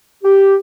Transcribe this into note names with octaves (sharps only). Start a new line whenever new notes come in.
G4